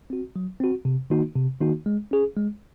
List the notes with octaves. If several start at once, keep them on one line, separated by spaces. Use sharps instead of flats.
C4 F#4
F#3
C4 F#4
C3
D#3 A#3 D#4 F#4
C3
D#3 A#3 D#4 F#4
G#3
C#4 G#4
G#3